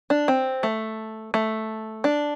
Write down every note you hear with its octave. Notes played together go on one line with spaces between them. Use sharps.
D4
C4
A3
A3
D4